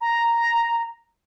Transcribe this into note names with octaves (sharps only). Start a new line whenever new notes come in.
A#5